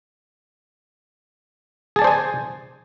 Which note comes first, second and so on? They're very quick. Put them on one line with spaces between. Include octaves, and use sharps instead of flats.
G#4 A5 D5 C5 G#5